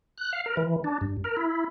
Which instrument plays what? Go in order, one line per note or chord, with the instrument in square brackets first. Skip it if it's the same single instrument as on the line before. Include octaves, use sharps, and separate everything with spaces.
[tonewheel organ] F#6
F5
A#4
E3
D4
G2
A#4
E4